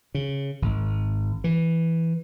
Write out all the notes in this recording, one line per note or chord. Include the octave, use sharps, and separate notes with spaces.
C#3
G#1
E3